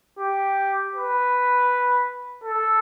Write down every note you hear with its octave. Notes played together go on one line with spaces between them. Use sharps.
G4
B4
A4